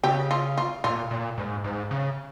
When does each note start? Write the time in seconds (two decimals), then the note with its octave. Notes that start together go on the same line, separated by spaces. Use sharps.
0.03 C#3 G4
0.31 F4
0.58 F4
0.84 A#2 F4
1.11 A#2
1.38 G#2
1.64 G#2
1.91 C#3